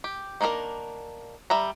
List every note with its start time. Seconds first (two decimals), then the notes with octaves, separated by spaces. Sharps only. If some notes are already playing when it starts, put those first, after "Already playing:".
0.04 G4
0.41 D#3 A#3 D4 F4 A#4
1.50 G3 E5 A#5